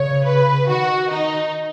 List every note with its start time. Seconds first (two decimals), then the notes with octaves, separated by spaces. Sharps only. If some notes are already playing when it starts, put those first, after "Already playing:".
Already playing: C#3 C#5
0.25 B4
0.69 D#3 F#4
1.11 D#4